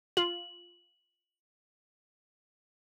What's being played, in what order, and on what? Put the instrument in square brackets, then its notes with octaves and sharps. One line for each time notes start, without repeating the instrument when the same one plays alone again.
[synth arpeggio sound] F4 [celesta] F#7